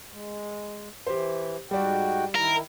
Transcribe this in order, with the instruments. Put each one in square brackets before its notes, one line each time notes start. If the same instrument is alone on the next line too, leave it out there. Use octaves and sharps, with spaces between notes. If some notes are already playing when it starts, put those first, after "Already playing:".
[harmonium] G#3
[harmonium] E3 [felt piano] G4 C5
[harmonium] G#2 F#4 G5 [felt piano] G3 D5
[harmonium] D#3 E4 [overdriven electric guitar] A#4